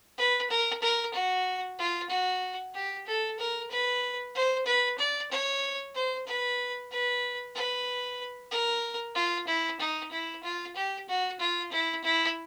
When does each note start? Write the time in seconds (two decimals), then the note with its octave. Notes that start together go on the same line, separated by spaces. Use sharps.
0.18 B4
0.50 A#4
0.82 A#4
1.14 F#4
1.79 F4
2.10 F#4
2.74 G4
3.07 A4
3.39 A#4
3.70 B4
4.35 C5
4.66 B4
4.98 D5
5.31 C#5
5.94 C5
6.27 B4
6.91 B4
7.55 B4
8.51 A#4
9.15 F4
9.47 E4
9.80 D#4
10.12 E4
10.43 F4
10.76 G4
11.08 F#4
11.40 F4
11.72 E4
12.04 E4